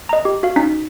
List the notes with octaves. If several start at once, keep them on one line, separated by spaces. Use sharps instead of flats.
D#5 A#5
G4
F#4 F5
C#4 D#4 B6